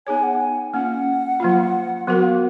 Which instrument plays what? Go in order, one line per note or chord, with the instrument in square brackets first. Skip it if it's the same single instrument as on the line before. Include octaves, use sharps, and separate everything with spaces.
[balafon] B3 D#4 G#4 C#5 [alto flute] G#5
[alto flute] F#5
G#5
[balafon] A#3 C#4 F4 [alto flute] F#5
[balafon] F#3 A#3 F4
[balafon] F#3 B3 F#4 A#4 [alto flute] F#5
[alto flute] F5